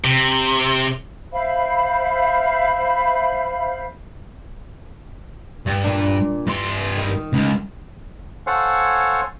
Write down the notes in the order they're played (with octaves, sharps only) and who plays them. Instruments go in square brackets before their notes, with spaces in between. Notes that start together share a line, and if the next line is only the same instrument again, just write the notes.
[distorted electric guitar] C3
[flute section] C5 E5 F5 B5
[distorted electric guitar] G2
[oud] A#2 D4
[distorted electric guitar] G2 C6 [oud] E3
[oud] D#3
[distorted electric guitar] C#2
[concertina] A4 C5 C#5 F5 F#5 G#5